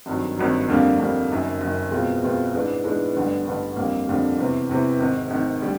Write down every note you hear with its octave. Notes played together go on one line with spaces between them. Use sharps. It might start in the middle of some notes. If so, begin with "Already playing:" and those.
G#1 G2 D#3 F#3
G#1 G2 D#3 F#3
F2 D3 G3 A#3
F2 D3 G3 A#3
F#1 F#2 D#3
F#1 F#2 D#3
E2 B2 G#3 C4 F4
E2 B2 G#3 C4 F4
G#2 E3 G#3 B3 D4
G#2 E3 G#3 B3 D4
A1 G2 D3 G3 B3
A1 G2 D3 G3 B3
F2 D3 G3 A#3
F2 D3 G3 A#3
E2 C3 E3
E2 C3 E3
G#1 G#2 D#3
G#1 G#2 D#3
D3 G3